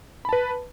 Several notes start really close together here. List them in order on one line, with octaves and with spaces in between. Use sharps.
B5 A5 B4